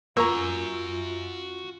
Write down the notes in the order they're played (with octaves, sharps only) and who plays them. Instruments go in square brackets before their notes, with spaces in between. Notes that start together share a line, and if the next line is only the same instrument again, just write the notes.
[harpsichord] A#3 [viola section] F4 [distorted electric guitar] F#4 G#5 [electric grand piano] A#5 C#6 E6